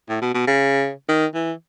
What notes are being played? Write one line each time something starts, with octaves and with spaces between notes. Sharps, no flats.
A2
B2
B2
C#3
D#3
E3